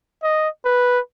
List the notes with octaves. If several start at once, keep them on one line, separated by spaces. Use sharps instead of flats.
D#5
B4